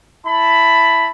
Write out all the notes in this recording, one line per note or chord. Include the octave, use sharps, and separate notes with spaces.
E4 A5 B5